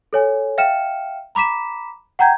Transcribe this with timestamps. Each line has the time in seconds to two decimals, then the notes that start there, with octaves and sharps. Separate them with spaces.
0.13 A4 C#5 G#5
0.58 E5 F5 G5 F6 C#7 E7
1.35 A#5 B5 D6 B6 E7
2.19 F#5 G5 A#5 G6 G#6